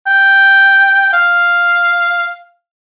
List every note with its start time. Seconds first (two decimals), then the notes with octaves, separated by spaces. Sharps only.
0.06 G5
1.13 F5